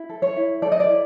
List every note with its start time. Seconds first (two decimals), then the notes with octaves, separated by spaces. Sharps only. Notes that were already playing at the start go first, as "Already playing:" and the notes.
Already playing: E4
0.09 A4
0.22 C#5
0.36 E4
0.62 A4 D5
0.72 D#5
0.80 D5
0.89 E4